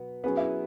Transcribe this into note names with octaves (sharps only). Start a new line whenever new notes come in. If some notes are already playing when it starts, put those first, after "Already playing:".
Already playing: B2 F#3 B3
F#3 B3 C#4 G#4 B4
E4